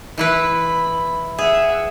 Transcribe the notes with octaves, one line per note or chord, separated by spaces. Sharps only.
E3 E4 B4 B5
G#4 E5 F#5